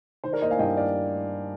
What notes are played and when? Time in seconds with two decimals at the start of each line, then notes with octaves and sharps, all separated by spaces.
0.24 D#3 C5
0.33 A#4 D5
0.42 A#3 C5 D#5
0.50 F5 G#5
0.59 G2 D#5 G5
0.77 D5 F5